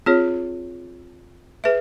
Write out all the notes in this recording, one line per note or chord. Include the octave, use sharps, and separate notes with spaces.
C4 F4 G#4 C#5
G#4 B4 E5